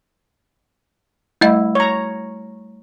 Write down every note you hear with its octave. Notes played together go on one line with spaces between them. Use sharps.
G3 A3 E4 D#5
C#5 A#5